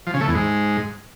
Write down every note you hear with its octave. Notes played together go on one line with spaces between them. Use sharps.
F3
C#3
A3
E2
G#2